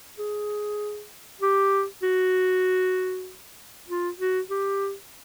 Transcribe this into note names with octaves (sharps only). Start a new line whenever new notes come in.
G#4
G4
F#4
F4
F#4
G4